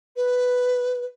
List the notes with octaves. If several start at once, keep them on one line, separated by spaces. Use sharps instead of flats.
B4